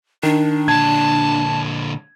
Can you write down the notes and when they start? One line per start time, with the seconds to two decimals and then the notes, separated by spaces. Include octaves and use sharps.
0.23 D#3 D4
0.68 A#2 D3 A5 G#6